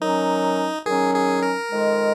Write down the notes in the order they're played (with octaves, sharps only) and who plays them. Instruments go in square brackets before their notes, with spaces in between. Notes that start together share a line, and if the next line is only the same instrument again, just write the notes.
[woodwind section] D#3 F#3 C#4 [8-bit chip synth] D#4
[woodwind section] D#3 F#3 C#4 [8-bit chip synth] G#4
[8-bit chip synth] G#4
A#4
[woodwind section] F2 D#3 G#3